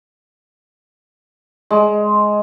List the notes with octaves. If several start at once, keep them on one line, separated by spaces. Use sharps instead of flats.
G#3